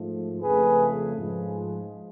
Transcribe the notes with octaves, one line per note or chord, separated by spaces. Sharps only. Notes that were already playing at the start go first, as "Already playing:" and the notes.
Already playing: G#2 F3 A3
F2 C#3 F3 A3 G#4 B4
G#2 F3 G#3